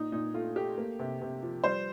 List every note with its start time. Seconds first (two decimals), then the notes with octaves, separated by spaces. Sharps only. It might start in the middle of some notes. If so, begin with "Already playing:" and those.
Already playing: A#2 D#4
0.12 A#2 D#4
0.34 A3 F4
0.56 A3 G4
0.78 A#3
0.99 C3
1.21 C3
1.43 F3
1.64 G3 C5